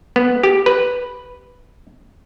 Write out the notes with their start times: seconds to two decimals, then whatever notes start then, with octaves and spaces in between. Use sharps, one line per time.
0.16 B3
0.43 G4
0.66 B4